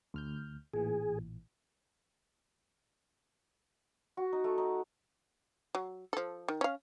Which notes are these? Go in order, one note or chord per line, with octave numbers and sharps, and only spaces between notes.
D2 F6 G6
A1 A#2 E3 G#4
F#4
D#4
A3
D#4
F#3
F3 A4
D#3
C#4 F5